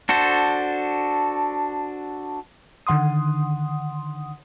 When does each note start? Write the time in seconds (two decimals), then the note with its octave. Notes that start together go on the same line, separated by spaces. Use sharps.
0.09 D4 F#4 A4 C5
2.87 D3 D#3 F#5 C6 D#6